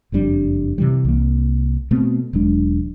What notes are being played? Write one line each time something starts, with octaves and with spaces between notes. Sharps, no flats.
F#1 F2 G3 D4
C3 E3 G3
C2 A#3
B2 A3 B3 C4
E1 F#3 G#3 D4